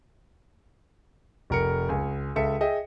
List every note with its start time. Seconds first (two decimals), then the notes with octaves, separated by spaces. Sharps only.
1.50 F1 A#4 C#7
1.89 C#2 G#5
2.36 C#2 A4 E5 C#7
2.61 G#4 D#5 E5 G5